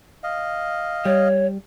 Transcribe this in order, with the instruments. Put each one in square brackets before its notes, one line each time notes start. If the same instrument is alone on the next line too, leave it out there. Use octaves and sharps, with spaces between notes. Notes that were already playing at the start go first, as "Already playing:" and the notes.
[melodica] D#5 F5
[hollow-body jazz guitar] G3 [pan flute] C#5